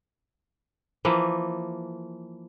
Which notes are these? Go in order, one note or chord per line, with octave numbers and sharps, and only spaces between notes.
E3 F3 A#3